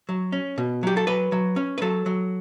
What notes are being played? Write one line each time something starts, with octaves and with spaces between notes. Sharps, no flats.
F#3
C#4
B2
F#3 G4
A4
F#3 B4
F#3
C#4
B4
F#3 A4
F#3